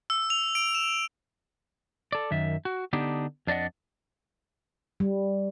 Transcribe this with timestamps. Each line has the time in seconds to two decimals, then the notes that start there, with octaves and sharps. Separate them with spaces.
0.10 E6
0.30 F7
0.55 D7
0.75 E7
2.12 A4 D5
2.31 F#2 D#3 E5
2.65 F#4
2.93 D3 B3 D4 D#4 G4
3.47 F2 D4 D5 D#5 F#5
5.00 G3